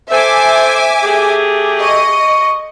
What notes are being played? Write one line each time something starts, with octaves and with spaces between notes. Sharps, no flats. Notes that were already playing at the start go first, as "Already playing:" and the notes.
A4 C5 E5 G#5 D6
A3 G4 G#4
D#5 C#6